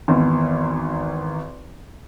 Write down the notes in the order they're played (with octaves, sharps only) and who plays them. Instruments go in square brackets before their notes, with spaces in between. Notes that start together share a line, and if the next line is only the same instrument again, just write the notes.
[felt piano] G#1 E2